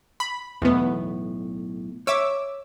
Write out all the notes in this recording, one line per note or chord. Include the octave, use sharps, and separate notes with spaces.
B5
B1 E2 A2 B3
C#5 E5 D6 E6